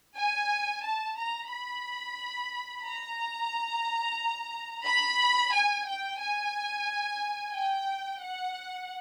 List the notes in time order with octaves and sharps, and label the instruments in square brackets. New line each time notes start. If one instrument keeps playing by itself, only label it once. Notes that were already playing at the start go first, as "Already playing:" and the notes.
[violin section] G#5
A5
A#5
B5
A#5
B5
G#5
G5
G#5
G5
F#5